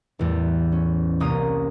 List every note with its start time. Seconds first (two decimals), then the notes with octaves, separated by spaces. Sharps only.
0.19 A1 E2 G3
0.72 C#4
1.20 C2 A#3 C#4 A#5 D#6